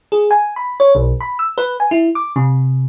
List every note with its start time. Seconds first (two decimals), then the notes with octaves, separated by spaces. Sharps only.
0.12 G#4
0.31 G#5
0.56 B5
0.80 C#5
0.95 B1
1.21 B5
1.39 E6
1.58 B4
1.80 G#5
1.91 E4
2.15 D6
2.36 C3